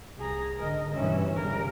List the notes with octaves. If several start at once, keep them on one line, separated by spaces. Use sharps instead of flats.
C2 G#4 A#5
G#2 D3 A#4 D#5
G2 B2 E3 C#4 E5
G1 C#3 G3 A#4